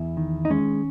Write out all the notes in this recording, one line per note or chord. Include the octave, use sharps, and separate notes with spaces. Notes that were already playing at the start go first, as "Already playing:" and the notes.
Already playing: E2 E4
D#3
D#4
G#3 C#4